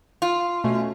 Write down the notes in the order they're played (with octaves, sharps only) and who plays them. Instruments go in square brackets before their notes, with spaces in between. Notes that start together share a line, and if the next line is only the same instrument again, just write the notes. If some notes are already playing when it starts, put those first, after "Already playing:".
[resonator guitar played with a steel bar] F4
[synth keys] B2 A3 C#4